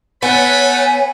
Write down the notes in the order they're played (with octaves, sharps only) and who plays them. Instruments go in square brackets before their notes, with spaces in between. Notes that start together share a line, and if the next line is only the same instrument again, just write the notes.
[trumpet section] A3 F#5 B5 [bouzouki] B3 [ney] C#5 [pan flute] G#5